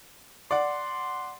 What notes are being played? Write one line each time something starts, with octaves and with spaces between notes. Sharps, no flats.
D5 F#5 C6